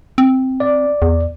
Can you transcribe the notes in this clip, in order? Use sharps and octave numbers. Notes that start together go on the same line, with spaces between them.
C4
D5
E2